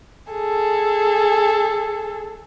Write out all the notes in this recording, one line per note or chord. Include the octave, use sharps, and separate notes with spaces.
G#4 A4